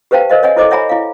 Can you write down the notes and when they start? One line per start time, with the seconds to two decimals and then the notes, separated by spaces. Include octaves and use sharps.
0.11 G4 B4 C5 F5 G5 A5
0.30 A#4 C5 D#5 F5
0.43 C#5 D#5 F#5 G#5
0.57 E4 A4 C5 D#5 D6
0.71 C#5 E5 F#5 G#5 A#5 B5
0.89 E4 F5